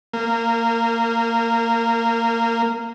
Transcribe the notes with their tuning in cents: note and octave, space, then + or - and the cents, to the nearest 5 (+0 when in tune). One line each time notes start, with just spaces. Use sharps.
A#3 -20